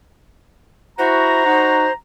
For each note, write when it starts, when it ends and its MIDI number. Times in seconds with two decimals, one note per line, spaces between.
0.98 1.43 64
0.98 1.43 66
0.98 1.92 72
0.98 1.94 82
1.45 1.86 63
1.45 1.86 66